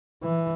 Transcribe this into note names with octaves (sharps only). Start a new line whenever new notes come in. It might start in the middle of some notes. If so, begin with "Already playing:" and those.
E3